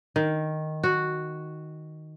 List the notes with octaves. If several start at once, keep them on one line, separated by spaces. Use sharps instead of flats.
D#3
F#4